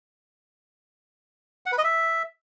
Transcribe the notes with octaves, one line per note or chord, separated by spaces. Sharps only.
F#5
B4
D#5
E5